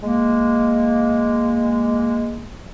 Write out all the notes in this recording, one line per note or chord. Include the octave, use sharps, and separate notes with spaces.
G#3 A#3